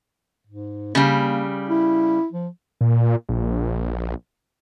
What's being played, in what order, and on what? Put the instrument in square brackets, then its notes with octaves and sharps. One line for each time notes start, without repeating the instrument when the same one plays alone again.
[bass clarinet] G#2
[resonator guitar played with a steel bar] C#3 G3 [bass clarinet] A#3
[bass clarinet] E4
F3
[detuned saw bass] A#2
A#1